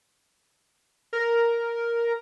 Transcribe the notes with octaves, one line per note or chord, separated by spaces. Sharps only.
A#4